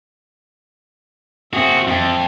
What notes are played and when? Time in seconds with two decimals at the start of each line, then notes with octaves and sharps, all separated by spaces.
1.53 C4 F#4 G#4 E5
1.88 F2